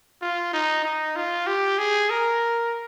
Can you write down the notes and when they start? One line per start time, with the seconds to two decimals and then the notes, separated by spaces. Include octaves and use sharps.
0.22 F4
0.53 D#4
0.84 D#4
1.16 F4
1.47 G4
1.78 G#4
2.10 A#4